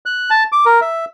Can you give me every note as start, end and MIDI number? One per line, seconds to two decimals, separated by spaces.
0.06 0.30 90
0.30 0.44 81
0.52 0.65 86
0.65 0.80 70
0.81 1.05 76